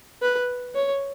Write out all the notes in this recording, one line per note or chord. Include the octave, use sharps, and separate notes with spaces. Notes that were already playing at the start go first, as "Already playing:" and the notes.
B4
C#5